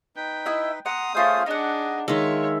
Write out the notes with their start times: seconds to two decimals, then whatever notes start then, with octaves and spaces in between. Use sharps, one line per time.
0.16 D#4 B4 G5
0.46 E4 D#5 E5
0.86 F#5 A#5 C6 D#6
1.15 A3 C#4 F4 G#4 C5 F5
1.46 D4 D#4 G#4 D#5 F#5
2.08 D#3 G#3 F4 C#5 E5